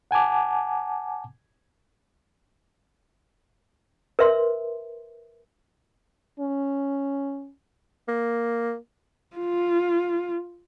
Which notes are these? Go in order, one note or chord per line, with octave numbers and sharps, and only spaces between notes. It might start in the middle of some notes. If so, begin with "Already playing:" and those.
F#5 G#5 A5 D6
A#4 B4 E5 C6
C#4
A#3
F4